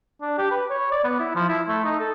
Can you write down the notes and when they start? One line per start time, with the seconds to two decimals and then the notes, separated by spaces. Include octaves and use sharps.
0.22 D4
0.38 G4
0.51 B4
0.70 C#5
0.92 D5
1.04 B3
1.20 E4
1.35 F3
1.49 E4
1.68 A3
1.85 D#4
2.00 A4